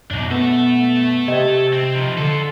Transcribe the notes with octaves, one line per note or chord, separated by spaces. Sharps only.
F#2 B2 D4 D#4
B3 A4 E5
C3 D#5 G#6 D#7
C4
F3 D#4
D3 F4 A4